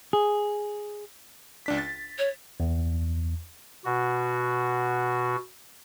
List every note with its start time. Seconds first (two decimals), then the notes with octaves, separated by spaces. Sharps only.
0.13 G#4
1.66 C#2 D4 B6
1.78 A6
2.19 C#5
2.60 E2
3.85 B2 F#4